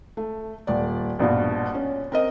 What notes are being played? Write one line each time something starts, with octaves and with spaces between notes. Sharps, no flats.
A3
D#1 D5
A#1 G2 B2 F5
C#4
C4 A#4 D#5